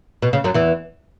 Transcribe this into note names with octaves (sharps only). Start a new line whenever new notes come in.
B2
C#3
F#2 F#3
E2 E3